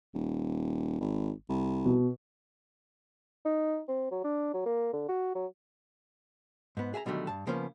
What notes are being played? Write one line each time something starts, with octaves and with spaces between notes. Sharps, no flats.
D#1
G#1
C2
B2
D#4
C4
F#3
D4
F#3
A#3
D3
F#4
F#3
G#2 B3
G#4 E5 G#5 A#5
B2 D3 D#3 F#3 G3 A3
G2 A5
C#3 F3 A#3 B3 C#4